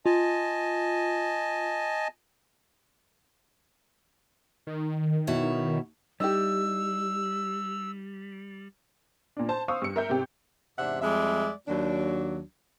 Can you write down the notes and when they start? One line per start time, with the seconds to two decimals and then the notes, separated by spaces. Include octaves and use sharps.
0.06 F4 D#5 G#5 A5
4.67 D#3
5.27 B2 E4 C#5
6.20 G3 D#4 E4 G4 E6
9.37 A#2 D4
9.49 C5 A5
9.68 C5 F5 C#6 D#6 E6
9.82 G2 C#7
9.96 A#4 E5 G6
10.09 G#1 C3 G4
10.78 E2 G#2 C3 D4 E5 F#5
11.02 F2 G3 G#3 D5 E5
11.68 D#2 F#3 D4